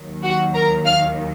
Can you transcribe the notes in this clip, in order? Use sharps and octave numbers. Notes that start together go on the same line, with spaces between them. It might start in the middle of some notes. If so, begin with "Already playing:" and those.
Already playing: D#2 D#3 F#3
F#4 F#5
A#4 A#5
F5 F6